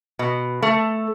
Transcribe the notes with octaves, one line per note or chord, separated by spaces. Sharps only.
B2
A3